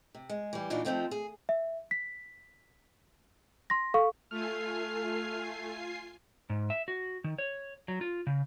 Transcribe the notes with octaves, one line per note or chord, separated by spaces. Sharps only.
C3
G#3
E3 G3
A#2 E3 D4 D#4 F4 F#4
F3 F#3 A3 C4 D#4 F4
G#4
E5
B6
C6 A#6
A4 F5 C#6
A3 F4 A4 G#5 F6 C7
G#2
E5
F#4
D#3
C#5
F#3
F4
C#3